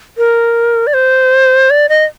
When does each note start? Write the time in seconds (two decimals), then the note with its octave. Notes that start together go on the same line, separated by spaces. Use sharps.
0.18 A#4
0.87 D5
0.94 C5
1.70 D5
1.89 D#5